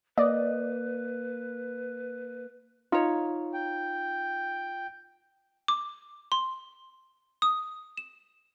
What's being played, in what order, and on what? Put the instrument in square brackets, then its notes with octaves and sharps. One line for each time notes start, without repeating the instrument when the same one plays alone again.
[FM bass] A#3 [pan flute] B4 [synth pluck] D5 D#5
[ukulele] D#4 C#5 [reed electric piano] F4
[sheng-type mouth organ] G5
[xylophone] D6
C6
D#6
E7